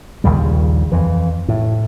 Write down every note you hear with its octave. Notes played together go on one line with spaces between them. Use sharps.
A#1 D#2 C#3 G3
F2 E3
A2